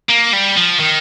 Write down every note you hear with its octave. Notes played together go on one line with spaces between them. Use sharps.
A#3
G3
F3
D#3